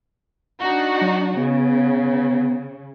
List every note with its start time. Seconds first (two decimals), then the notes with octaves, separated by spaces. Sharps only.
0.60 D4 D#4 F#4
1.01 F#3
1.37 C#3 B3